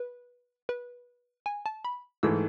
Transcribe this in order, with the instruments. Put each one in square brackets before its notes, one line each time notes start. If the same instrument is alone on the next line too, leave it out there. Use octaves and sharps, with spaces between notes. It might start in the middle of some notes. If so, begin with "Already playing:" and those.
Already playing: [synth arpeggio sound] B4
B4
G#5
A5
B5
[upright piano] G#2 E3 A3 [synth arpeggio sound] E6